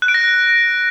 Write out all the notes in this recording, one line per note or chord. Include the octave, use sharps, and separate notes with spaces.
F#6
D7
A#6